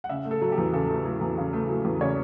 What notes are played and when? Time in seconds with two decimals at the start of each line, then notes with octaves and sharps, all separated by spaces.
0.04 F#5
0.09 C#3 E5
0.25 A3
0.31 A4
0.42 F#3
0.52 G4
0.58 E2
0.73 C#3 A4
0.89 A3
1.05 F#3
1.21 E2
1.38 C#3
1.53 A3
1.69 F#3
1.85 E2
2.01 C#3 C#5